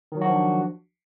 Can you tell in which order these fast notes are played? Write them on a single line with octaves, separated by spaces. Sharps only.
D#3 F#3 F#4 F3 D4